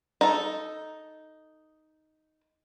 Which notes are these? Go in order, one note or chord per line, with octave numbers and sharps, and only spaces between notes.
D#4 A4